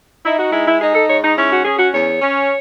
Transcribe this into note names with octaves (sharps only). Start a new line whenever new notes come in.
D#4 E4
F#4
G#3 E4
E4
D#4 G#4
A4
G#2 C#5
D#4
C#4 E4
F#4
C#4 G#4
F#4
E2 C#5
C#4